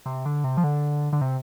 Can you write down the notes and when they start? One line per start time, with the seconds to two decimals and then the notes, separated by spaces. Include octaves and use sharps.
0.06 C3
0.25 D3
0.44 C3
0.57 F3
0.64 D3
1.13 D3
1.21 C3